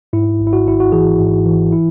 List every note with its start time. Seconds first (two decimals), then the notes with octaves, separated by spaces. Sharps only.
0.13 G#2 E4
0.40 G#1
0.47 E4
0.53 F#4
0.67 G#1 E4
0.80 F#4
0.92 E3 G#4
1.19 G#2
1.46 E3
1.73 E4